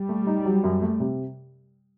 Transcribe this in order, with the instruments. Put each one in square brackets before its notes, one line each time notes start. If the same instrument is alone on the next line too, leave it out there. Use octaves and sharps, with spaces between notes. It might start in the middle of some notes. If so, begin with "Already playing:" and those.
Already playing: [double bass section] G3
[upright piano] A3
D#4
F#3
F#2
A3
C3